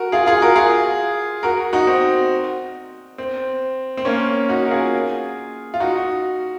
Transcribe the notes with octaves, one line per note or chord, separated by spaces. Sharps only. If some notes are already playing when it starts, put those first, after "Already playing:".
Already playing: F#4 A#4
F4 G#4
F4 G#4
F#4 A#4
F4 G#4
F#4 A#4
D#4 F#4
C4
C4
C4
A#3 C#4
D#4 F#4
A#4
F4 G#4
F4
D#4 F#4